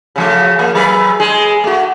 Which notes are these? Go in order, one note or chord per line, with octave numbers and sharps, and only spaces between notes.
C#3 F3 A3
F3 A#3
F#3 G#4 B4
G#3 G#4
A3 F#4